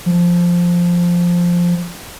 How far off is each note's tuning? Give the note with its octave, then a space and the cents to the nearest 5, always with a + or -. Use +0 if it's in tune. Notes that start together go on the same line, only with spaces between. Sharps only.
F3 +0